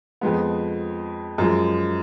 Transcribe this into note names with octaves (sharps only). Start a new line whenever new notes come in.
F2 F3 G#3 B3
F#2 F3 G#3